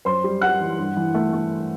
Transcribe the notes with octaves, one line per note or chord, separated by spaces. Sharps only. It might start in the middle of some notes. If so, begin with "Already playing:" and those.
F#2 C5 C6
G3
G3 F#5 F#6
E3
G2
E3
A3
A3